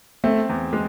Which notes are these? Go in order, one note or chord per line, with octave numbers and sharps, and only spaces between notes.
A3 C4
E2
G#3